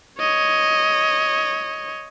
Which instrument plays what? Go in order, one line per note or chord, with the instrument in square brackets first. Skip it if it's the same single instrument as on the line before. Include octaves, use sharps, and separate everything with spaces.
[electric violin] C#5 D#5